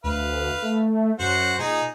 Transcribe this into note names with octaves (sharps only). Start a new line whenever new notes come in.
D2 B4 F5
A3
F#2 F#4 C5 F#5
A#2 D#4 G#4